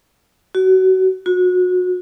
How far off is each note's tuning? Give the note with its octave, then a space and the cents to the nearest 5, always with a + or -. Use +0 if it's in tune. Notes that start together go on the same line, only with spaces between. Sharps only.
F#4 +25
F#4 -30